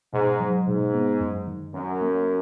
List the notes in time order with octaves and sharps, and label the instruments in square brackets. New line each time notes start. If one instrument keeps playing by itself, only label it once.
[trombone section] G#2 [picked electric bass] B2
[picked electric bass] F#3
[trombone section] G#2 [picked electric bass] B2
[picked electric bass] B3
F#2
D#3
[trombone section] F#2 [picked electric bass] C#4
[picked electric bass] A#3